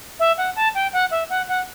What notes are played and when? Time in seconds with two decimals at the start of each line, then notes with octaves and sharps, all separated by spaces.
0.19 E5
0.37 F#5
0.56 A5
0.74 G5
0.93 F#5
1.11 E5
1.29 F#5
1.48 F#5